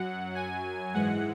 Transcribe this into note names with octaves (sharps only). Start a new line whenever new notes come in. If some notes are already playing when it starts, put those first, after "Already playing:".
Already playing: F#2 F#3 F#5
G#5
G#2 E3 G#3 F#5